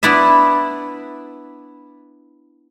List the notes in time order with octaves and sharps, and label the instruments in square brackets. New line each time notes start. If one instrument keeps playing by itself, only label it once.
[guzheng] B3 D4 E4 D5 E5